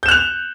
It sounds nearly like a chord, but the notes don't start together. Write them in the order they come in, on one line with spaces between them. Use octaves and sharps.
G6 E7 F#6 F7